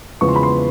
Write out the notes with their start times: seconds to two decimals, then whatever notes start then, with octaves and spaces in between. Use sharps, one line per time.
0.21 E2 C#3 F3 G#3 B3 C#6
0.29 C6
0.36 B5
0.43 C6